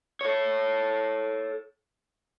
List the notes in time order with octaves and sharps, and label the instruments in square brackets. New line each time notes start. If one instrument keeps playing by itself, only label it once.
[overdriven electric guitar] A4 C#5